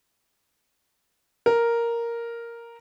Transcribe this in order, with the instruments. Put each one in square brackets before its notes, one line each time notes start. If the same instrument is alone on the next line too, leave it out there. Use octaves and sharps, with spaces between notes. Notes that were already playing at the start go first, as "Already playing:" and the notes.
[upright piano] A#4